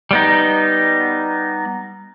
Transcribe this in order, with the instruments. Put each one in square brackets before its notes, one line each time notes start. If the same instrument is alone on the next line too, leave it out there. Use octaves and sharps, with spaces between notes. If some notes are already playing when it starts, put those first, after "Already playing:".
[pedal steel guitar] G3 B3 D#4